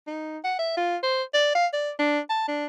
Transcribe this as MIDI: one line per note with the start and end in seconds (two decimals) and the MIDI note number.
0.07 0.38 63
0.44 0.57 78
0.59 0.73 76
0.77 0.97 65
1.03 1.23 72
1.34 1.52 74
1.55 1.67 77
1.73 1.91 74
1.99 2.19 62
2.30 2.47 81
2.48 2.67 62